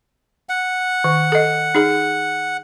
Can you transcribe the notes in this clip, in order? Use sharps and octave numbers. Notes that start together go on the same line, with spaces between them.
F#5
D#3
A4 D#5
D#4 G#4